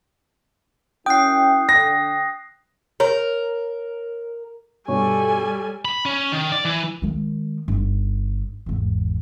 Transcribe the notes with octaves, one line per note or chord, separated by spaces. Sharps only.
F#2 C#4 E4 G5 D#6 F#6 C7
D3 A#6
A#4 C#5
G2 B2 G3 A4 C#5 G#5 C#6
B5
C#4
D#3
D5
E3
D#3 G#3
G1 D#4
G#1 E2